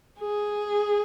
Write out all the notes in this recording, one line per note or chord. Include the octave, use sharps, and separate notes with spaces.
G#4